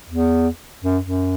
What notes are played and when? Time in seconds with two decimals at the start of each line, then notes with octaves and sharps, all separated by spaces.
0.09 E2
0.84 F#2
1.03 F#2